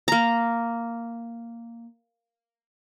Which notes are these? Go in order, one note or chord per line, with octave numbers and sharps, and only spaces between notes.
A#3 A#5